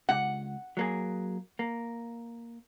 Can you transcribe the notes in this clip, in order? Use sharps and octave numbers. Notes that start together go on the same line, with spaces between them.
C#2 F#5
F#3 A#3 G#4
A#3